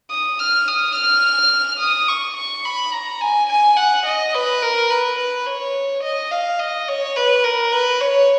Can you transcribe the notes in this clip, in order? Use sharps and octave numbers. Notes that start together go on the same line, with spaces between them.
D#6
F6
D#6
F6
D#6
C#6
C#6
B5
A#5
G#5
G#5
F#5
D#5
B4
A#4
B4
B4
C#5
D#5
F5
D#5
C#5
B4
A#4
B4
C#5